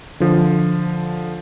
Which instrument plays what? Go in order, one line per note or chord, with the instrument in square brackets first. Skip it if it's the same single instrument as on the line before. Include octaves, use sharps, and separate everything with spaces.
[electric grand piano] D3 F3